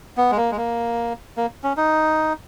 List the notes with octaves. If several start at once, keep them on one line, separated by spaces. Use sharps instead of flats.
B3
G#3
A#3
G#3
A#3
A#3
C#4
D#4